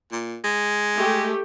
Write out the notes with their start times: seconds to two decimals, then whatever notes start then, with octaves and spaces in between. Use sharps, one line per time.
0.12 A#2
0.44 G#3
0.95 A3 G4